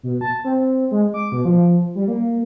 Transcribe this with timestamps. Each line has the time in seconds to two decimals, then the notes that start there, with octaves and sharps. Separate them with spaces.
0.03 B2
0.21 A5
0.45 C4
0.91 G#3
1.14 D6
1.32 B2
1.45 F3
1.95 G3
2.08 A#3